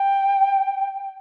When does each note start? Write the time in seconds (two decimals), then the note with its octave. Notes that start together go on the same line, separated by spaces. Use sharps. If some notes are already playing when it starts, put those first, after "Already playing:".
Already playing: G5